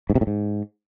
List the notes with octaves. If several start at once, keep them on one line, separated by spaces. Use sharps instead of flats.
G#2
C3
A2
G#2